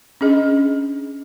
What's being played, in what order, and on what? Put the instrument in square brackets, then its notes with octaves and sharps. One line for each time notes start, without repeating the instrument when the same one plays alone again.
[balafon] C#4 D4 G#4 D#5